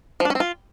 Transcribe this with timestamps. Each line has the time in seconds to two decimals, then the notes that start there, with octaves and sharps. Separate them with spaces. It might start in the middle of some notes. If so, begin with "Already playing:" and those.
0.20 F3
0.25 D4
0.30 C#4
0.35 C4
0.40 F4